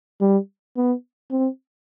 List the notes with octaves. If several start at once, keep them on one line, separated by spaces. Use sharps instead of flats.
G3
B3
C4